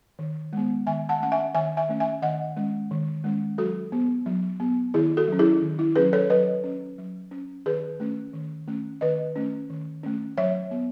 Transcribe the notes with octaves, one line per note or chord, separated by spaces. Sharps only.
D#3
G#3 B3
D#3 E5 G#5
F#5 A5
A3 C#4 F#5
E5 G#5
D#3 E5 G#5
E5 G#5
A3 C#4
E5 G#5
D#3 D#5 F#5
G#3 C#4
D#3
G#3 C#4
F#3 F#4 A4
B3
F#3
B3
D#3 E4 G#4
F#4 A4
F#3 C#4
E4 G#4
D#3
E4
F#3 C#4 G#4 B4
A4 C#5
F#3 B4 D#5
C#4
F#3
C#4
D#3 G#4 B4
A3 C#4
D#3
A3 C#4
D#3 B4 D#5
A3 C#4
D#3
A3 C#4
F#3 C#5 E5
B3